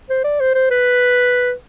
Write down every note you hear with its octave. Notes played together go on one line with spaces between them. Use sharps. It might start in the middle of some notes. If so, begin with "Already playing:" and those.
C5
D5
C5
C5
B4